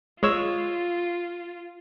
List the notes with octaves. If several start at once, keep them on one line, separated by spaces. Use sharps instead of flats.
G#3 F4 C#5 E6